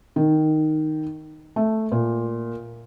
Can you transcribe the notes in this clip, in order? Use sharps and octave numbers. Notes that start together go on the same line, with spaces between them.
D#3
A3
A#2